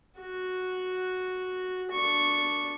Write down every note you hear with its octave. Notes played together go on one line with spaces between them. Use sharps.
F#4
D4 C#6